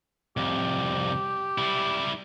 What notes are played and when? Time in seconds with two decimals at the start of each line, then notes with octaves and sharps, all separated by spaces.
0.37 C2 F2 G4
1.58 G3 E4